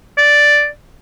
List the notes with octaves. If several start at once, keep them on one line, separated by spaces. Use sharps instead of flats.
D5